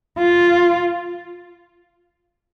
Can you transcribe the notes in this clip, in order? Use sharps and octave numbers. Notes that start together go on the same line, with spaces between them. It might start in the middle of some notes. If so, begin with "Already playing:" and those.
F4